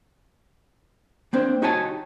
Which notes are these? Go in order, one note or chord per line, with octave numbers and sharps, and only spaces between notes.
A#3 C4 D4 C5
D#4 F#4 G4 C#5 G#5 A5